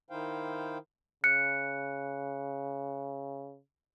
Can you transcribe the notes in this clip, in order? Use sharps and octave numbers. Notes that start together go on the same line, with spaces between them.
D#3 D#4 E4 C5 F5 G5
C#3 F#6 C#7